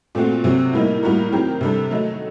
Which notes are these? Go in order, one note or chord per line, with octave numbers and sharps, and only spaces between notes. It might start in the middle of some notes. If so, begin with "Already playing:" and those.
A#2 A3 C4 F#4
C3 F#3 C4 F#4
A2 G3 A#3 D#4
A2 G3 A#3 F#4 A#4
D#3 F#3 C4 G4 A#4
C3 G3 D4 A4
D#3 F#3 A3 D#4